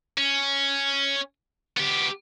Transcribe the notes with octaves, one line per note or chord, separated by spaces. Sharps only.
C#4
B3 G4